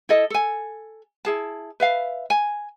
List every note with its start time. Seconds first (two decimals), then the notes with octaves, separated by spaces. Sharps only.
0.09 E4 A4 D#5
0.30 A4 G#5
1.25 E4 G#4 A5
1.80 B4 E5 F5
2.30 G#5